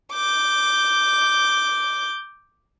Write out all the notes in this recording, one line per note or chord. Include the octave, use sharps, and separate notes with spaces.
D6 G6